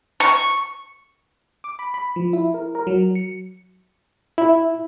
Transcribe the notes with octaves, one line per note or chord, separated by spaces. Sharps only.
C#6
D6
B5
B5
F3
E4
A#4
A#4
F#3
C#7
E4